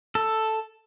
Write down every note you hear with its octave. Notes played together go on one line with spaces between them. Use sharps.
A4